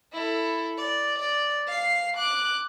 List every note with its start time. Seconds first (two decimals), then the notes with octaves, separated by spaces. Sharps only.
0.12 E4 A4
0.78 D5
1.19 D5
1.68 F5 C7
2.17 D6 F#6